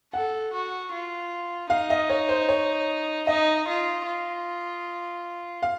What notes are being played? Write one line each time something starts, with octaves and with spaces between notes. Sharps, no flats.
A4 F#5
F#4
F4
D#4 F5
D#5
C#5
C5
C#5
D#4 D#5
F4
F4
F5